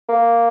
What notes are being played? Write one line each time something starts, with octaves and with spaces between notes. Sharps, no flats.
A#3